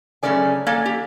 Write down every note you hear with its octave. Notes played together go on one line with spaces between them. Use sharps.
F#2 C#3 A3 C#4 D5 G#5
A#3 A4 D5 G#5
G4